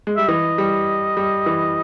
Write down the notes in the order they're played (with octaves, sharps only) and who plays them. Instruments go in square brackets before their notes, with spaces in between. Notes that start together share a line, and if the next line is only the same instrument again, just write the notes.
[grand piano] G#3
[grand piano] G3 [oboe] E5
[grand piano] E3 [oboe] D#5
[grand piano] G3
G3
E3